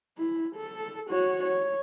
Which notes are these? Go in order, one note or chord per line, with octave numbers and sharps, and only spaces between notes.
E4
A4
F#4 C#5
C#5